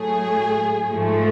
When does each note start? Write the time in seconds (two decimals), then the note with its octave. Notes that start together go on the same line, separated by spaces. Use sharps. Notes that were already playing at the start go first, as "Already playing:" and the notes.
Already playing: A2 F#3 A3 G#4
0.87 G#2 F3 A3